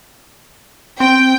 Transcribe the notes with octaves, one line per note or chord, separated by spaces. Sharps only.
C4 G5